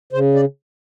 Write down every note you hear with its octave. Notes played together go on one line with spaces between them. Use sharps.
C#3 C5
D5